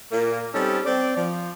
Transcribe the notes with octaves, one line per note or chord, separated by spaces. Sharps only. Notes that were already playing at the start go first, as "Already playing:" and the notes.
A#2 A#3
G3 C4 C#4 D#4 A4
C4 D5
F3